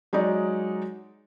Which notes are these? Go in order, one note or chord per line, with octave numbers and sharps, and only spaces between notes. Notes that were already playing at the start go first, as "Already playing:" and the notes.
F#3 G#3 D#4 D5